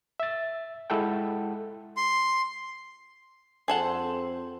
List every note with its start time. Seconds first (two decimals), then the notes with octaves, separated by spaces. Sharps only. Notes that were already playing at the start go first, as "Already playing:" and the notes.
0.20 E5 A6
0.90 G#3 E4 A4 F#5 G5
1.97 C6
3.68 F2 C4 G#4 A4 C5 F#5